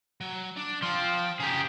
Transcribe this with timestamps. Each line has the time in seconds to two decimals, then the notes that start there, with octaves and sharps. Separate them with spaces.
0.21 F#3
0.56 D4
0.82 F3 G5 C6
1.40 C#3 G4 G#4 A#5